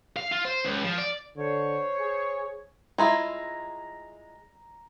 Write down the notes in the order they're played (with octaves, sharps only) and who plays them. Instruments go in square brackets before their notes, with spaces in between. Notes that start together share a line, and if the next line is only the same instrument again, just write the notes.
[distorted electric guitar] F5
F4
C5
C#2
F3
D5
[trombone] D3 [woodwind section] C5 C#5
[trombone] G#4
[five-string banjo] G#3 E4 F4 [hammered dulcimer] A#5